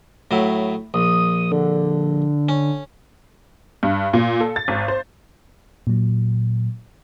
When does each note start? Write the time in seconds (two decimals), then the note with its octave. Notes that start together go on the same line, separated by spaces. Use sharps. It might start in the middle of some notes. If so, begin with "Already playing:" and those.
0.31 A2 F#3 E4
0.94 A#1 D#6
1.52 D3
2.49 C#4
3.83 G2
4.13 A#2
4.41 A4
4.56 A6
4.68 G#1
4.88 C5
5.87 A#2 F#3